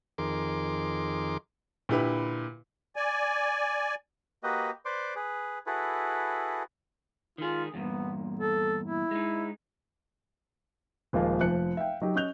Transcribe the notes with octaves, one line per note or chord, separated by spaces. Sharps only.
F2 D#3 G#4 A#4 C6 D6
A#2 D3 E4 G4 B4 B5
D5 G#5
A#3 F#4 G4 B4 D#5
B4 C5 D5 C6 D6
G#4 B4
E4 F#4 G#4 A4 B4
D#3 F4 G#4
E2 G2 A#2 B3
A4
E4
G#3 D#4
D#1 F3 G#3 A#3 F4
F1 F3 F#6 C#7
E5 F5 G5
F#3 D#4 G4
C#4 D#5 F#6 G6 F7